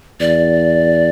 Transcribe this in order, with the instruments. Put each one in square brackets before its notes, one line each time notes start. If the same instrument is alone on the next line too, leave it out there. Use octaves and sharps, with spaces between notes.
[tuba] E2 [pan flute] D5